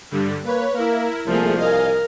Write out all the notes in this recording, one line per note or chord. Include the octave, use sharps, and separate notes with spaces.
G2 D3 G3
A#3 B4 C#5
A#3 E4 A#4
C2 F3 A3 A#3 G#4
A#4 D#5 F5 G#5